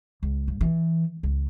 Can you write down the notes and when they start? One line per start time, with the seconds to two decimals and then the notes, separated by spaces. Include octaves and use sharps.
0.23 C#2
0.48 G2
0.61 E3
1.23 C#2